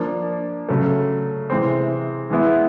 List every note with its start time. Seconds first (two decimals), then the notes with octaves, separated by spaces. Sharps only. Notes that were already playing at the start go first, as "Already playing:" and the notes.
Already playing: F3 A#3 D4
0.69 C#3 F#3 A3
1.50 C3 E3 G#3 C4
2.30 E3 G#3 B3 E4